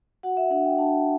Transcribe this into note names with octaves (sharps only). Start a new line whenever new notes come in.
F#4 F#5
E5
D4 F#5
G5
D4 A5